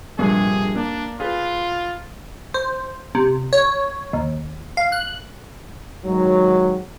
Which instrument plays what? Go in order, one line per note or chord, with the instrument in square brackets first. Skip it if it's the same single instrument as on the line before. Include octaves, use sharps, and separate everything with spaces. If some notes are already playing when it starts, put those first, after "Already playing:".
[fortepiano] A#1 G2 C3 [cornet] G#4
[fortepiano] A#3 [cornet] D4
[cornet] F4 [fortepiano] G#4 B4
[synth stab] C5
C3
C#5
D#2
F5
F#6
[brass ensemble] G#2 D#3 F#3